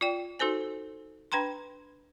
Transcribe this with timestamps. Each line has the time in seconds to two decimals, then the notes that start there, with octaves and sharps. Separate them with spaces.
0.01 F4 D5 G5
0.39 D#4 F#4 A4 C5 G#5
1.32 D4 B4 G5 A#5 C6